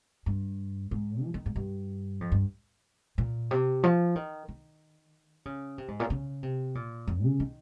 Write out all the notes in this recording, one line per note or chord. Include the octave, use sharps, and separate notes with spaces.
G2
G#2
F3
D#3
G#2
G2
F2
G2
A#2
C3
F3
D#3
D#3
C#3
C3
G#2
A#2
C#3
C3
A#2
F2
C#3
D#3